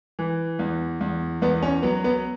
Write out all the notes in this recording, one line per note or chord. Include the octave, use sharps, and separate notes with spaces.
E3
E2
E2
E2 B3
C#4
F#3 B3
B3